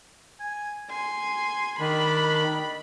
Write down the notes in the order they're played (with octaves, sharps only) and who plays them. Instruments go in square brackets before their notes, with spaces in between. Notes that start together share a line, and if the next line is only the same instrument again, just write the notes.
[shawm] G#5
[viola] G#5 [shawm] C6
[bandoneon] D#3 [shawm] D4 [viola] B5